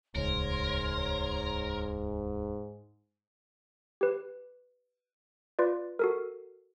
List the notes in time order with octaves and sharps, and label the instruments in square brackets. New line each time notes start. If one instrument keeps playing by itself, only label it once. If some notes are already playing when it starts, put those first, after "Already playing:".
[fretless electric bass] D#1 C#2 [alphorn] G#2 [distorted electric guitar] A#4 [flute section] C#5 C6
[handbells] G4 B4
F4 B4 D5
F#4 A4 A#4